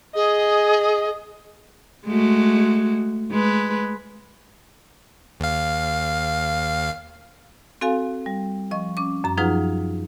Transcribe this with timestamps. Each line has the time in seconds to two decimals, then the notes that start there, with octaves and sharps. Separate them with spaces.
0.15 G#4 D#5
2.07 G#3 A3 F#4
3.31 G#3 B4
5.40 D#2 F5
7.81 C4 F#4 A4 F5 G#5
8.26 G3
8.71 F3 D#5 C#6
8.97 C#4 D6
9.24 F#2 A#5
9.37 F3 F#3 D#4 F4 G#4 B4